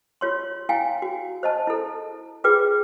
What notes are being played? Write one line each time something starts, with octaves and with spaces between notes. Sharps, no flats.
F4 C#5 C6
E4 F5 G5 G#5
F#4
C5 D#5 A5
E4 A4
F4 G#4 B4 G5 D6